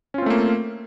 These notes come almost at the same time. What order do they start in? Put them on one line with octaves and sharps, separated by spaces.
C#4 F4 C4 A3 A#3